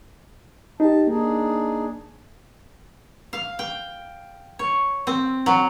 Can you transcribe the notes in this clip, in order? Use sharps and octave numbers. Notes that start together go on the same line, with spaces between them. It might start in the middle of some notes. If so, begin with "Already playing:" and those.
D#4 G4 A5
A#3 D4 D#4 G#4
F5
G5
C#5
C4
F#3